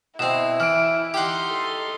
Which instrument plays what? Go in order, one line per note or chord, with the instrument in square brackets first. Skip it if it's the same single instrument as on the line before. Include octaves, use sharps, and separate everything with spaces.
[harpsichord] B2 C4 [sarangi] E4 [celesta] E7
[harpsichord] E3 [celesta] F6 D7
[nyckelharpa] D#4 C6 [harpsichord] G4 F#5
[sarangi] A4